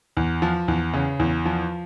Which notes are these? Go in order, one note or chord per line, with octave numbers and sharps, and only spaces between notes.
E2
F3
E2
C#3
E2
F3